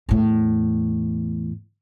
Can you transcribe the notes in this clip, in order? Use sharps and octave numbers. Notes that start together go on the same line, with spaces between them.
E2 A2